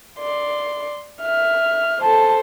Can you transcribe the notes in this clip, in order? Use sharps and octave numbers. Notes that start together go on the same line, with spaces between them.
D5 C6
E5 F6
A4 C5 A5